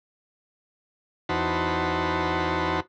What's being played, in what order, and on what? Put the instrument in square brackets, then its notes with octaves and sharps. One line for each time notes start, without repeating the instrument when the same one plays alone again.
[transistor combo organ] E2 D#4 F#4 C5 A5 B5